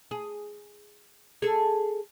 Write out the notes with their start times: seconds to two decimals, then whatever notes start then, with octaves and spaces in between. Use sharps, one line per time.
0.11 G#4
1.42 G#4 A4